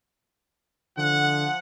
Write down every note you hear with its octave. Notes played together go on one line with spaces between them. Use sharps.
D3 F3 F#5